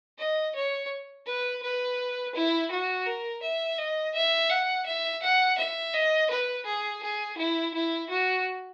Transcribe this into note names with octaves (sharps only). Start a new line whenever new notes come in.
D#5
C#5
B4
B4
E4
F#4
A#4
E5
D#5
E5
F#5
E5
F#5
E5
D#5
B4
G#4
G#4
E4
E4
F#4